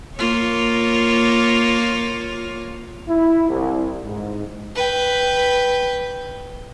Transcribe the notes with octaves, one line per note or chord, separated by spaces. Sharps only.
A#3 F4 C#5
E4
C2
G#2
B4 G5